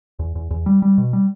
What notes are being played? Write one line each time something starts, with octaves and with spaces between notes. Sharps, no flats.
E2
E2
E2
G3
G3
B2
G3